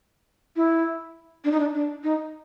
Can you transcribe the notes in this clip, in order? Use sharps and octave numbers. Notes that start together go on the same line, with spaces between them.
E4
D4
D#4
D4
D4
D#4